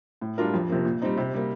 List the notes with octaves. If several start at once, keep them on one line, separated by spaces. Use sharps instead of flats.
A2
G3 D4 F4 A#4
F2
C3 F3 A#3
A#2
G3 C4 D#4
C3
G3 A#3